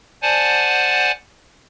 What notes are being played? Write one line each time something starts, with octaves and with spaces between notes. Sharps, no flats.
C5 D5 F#5 G#5 A5